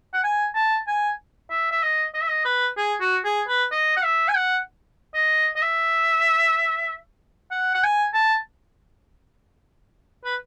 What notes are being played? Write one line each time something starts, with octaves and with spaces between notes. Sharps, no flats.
F#5
G#5
A5
G#5
E5
E5
D#5
D#5
E5
D#5
B4
G#4
F#4
G#4
B4
D#5
F#5
E5
G#5
F#5
D#5
D#5
E5
F#5
F#5
G#5
A5
B4